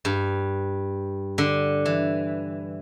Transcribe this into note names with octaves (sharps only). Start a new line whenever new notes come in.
G2
D3
E3